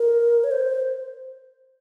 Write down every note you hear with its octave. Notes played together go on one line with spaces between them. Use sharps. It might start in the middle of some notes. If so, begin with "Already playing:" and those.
Already playing: A#4
C#5
C5